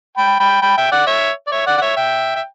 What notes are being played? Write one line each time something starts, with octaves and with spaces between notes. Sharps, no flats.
G5 B5
G5 B5
G5 B5
E5 G5
D5 F#5
C#5 E5
D5
C#5 E5
D5 F#5
F#5
C#5 E5
E5 G5
E5